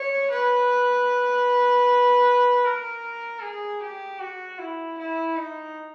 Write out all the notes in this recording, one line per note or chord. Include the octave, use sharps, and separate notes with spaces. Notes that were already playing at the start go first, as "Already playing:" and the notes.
Already playing: C#5
B4
A#4
G#4
G4
F#4
E4
E4
D#4